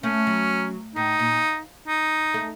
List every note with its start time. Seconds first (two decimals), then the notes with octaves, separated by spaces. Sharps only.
0.03 A3 C#4
0.27 F#3
0.96 A2 D#4
1.19 A#2
1.88 D#4
2.34 A3